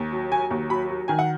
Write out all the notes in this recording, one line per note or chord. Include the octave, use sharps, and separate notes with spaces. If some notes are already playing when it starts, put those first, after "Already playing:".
Already playing: D#2
F#3
F#3 G#5
D#2
F#3 B5
F#3
D#3 G#5
F#5